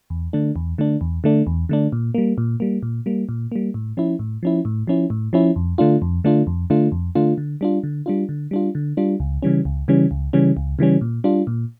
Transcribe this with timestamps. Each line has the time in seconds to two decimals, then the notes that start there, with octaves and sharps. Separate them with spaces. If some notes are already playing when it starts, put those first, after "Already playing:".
0.10 E2
0.33 D3 A3 D4
0.56 E2
0.78 D3 A3 D4
1.01 E2
1.24 D3 A3 D4
1.47 E2
1.69 D3 A3 D4
1.92 A#2
2.15 G3 A#3
2.38 A#2
2.60 G3 A#3
2.83 A#2
3.06 G3 A#3
3.29 A#2
3.52 G3 A#3
3.74 A2
3.97 F3 C#4 E4
4.19 A2
4.43 F3 C#4 E4
4.65 A2
4.87 F3 C#4 E4
5.10 A2
5.33 F3 C#4 E4
5.56 F2
5.78 D3 A3 D4 F4
6.02 F2
6.24 D3 A3 D4 F4
6.47 F2
6.70 D3 A3 D4 F4
6.92 F2
7.15 D3 A3 D4 F4
7.38 D3
7.61 G3 D4 F4
7.83 D3
8.06 G3 D4 F4
8.29 D3
8.51 G3 D4 F4
8.75 D3
8.97 G3 D4 F4
9.20 C#2
9.43 C#3 E3 G3 C#4
9.65 C#2
9.88 C#3 E3 G3 C#4
10.11 C#2
10.33 C#3 E3 G3 C#4
10.57 C#2
10.79 C#3 E3 G3 C#4
11.01 A#2
11.24 G3 D4 F4
11.47 A#2